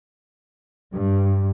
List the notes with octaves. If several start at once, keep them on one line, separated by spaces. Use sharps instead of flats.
G2